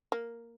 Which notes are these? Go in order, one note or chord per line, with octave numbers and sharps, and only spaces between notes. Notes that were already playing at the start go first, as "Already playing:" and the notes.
A#3